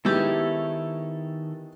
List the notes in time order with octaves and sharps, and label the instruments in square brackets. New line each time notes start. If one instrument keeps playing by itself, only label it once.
[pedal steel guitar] D#3 A4 C#5 [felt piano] G#3 B3 D#4 [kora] E4 G4